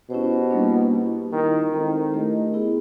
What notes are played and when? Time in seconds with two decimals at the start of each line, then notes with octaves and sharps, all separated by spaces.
0.10 B2 C#4 E4 G4 C5
0.51 G3 A#3 D4
0.91 C#4 E4 G4
1.32 D#3 F4 A#4 D#5
1.72 D#3 G#3 C4 E4 A4 C5
2.13 A3 D4 G4 A#4 D#5
2.54 B3 E4 G#4